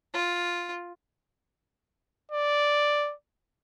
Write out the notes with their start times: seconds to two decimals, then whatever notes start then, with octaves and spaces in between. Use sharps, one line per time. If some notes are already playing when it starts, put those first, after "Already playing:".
0.13 F4
2.31 D5